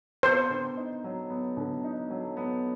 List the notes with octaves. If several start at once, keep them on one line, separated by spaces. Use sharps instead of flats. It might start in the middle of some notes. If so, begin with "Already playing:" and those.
B3 C5
D3
D#4
F#3
B3
D3
D#4
F#3
B3